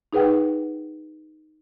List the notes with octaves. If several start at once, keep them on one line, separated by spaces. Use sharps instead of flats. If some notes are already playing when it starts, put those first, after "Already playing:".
D#4 G#4 B4 F#5 G5